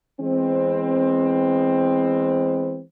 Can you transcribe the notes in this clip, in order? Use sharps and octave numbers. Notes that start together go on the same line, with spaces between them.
E3 G#3 B3 C4